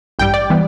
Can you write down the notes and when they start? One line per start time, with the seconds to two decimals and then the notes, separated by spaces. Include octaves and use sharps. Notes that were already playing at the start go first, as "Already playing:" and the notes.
0.19 A1 G2 G3 G5
0.34 D5
0.50 E3 G3 B3